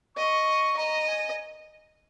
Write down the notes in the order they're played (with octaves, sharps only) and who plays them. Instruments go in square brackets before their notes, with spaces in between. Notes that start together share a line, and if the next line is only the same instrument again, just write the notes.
[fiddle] D#5 [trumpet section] C#6
[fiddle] D#5 [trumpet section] A#5
[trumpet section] G#5